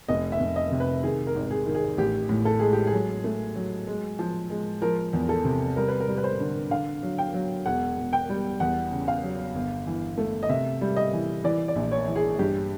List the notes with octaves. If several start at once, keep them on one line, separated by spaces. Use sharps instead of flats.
F1 D#5
E5
F1
D#5
C3
B4
D#3 G#4
A#4
G#1
G#4
D#3
G#4
A1 G4
A2
A4
G#3 G#4
G4
G#4
F#3
A3
F#3
G#3
F3
G#3
F3 A#4
E2
A4
C3
G3 A#4
B4
A#4
G3
B4
C5
D3
D3 F5
F#3
G5
F#3
E1 F#5
E1
G5
G3
E2 F#5
C#3
F5
F#3
G1
E3
A3
D#5
C3 E5
G3
D#5
E3
E3 D5
D5
A#1
C#5
E3
G#4
G2 G4